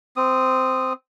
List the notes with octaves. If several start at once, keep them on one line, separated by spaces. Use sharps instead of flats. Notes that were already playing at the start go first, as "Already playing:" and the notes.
C4 D#6